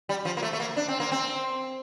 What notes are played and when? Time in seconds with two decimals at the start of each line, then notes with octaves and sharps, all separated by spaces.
0.09 G3
0.25 F3
0.37 A#3
0.43 A3
0.53 A3
0.60 A#3
0.77 D4
0.88 C4
1.00 A#3
1.12 C4